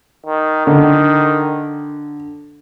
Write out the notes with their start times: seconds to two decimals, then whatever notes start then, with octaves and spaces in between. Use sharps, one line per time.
0.26 D#3
0.67 D3 D#3